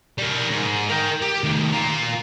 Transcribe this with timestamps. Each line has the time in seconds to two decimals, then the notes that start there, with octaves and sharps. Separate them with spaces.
0.18 G3 A#4
0.51 G#2
0.90 A#4 G5
1.22 G4
1.44 D#3 A3
1.72 F4 A#4